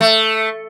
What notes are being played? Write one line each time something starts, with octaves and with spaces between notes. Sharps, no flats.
A3